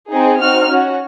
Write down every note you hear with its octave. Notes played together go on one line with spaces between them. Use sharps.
C4 D#4 G#4
C4 D#4 F#4 F6
C#4 F#4